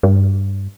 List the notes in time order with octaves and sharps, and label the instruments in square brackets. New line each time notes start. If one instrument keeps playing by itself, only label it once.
[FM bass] G2